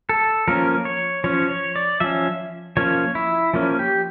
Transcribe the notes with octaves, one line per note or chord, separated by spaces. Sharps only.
A4
F3 A#3 C#4 A#4
C#5
F3 C#4 C#5
C#5
D5
F3 C#4 E5
F3 A#3 C#4 C#5
E4
F3 A#3 C#4
G4